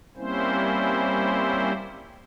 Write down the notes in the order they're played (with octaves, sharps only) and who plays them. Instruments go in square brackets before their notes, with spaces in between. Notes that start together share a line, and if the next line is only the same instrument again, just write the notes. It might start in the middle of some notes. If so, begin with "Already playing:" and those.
[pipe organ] G3 A#3 C4 C#4 E4 C5